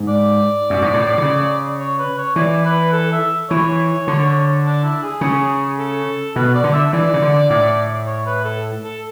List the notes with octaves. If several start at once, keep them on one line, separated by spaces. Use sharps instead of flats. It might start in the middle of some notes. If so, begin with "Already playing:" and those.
Already playing: G#2
D5
F#2
G#2
A2
D3
C#3
C#5
B4
C#5
E3 D5
B4
A4
E5
E3 C#5
D3
D4
E4
G#4
C#3
A4
B2 B4
D5
D3
E5
E3 D5
C#3
D3
A2
C#5
B4
A4
A4